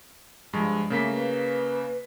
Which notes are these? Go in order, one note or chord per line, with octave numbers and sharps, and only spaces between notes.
G2 F3 G#3
C#3 A3 A#3 B6
B4